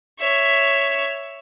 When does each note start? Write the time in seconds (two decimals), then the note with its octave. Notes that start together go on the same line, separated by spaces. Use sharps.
0.19 C#5 E5